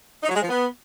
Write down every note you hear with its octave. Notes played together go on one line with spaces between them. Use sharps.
D#4
F#3
G#3
F3
B3